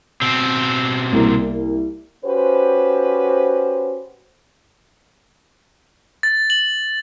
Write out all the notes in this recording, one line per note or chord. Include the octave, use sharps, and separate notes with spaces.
B2 C4
C2 A#3
C#4 F#4 G4 B4 C5
A6
F#7